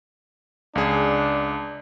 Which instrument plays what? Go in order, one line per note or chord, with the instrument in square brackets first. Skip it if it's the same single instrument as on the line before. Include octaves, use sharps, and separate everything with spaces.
[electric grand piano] C#2 G#4 [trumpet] D4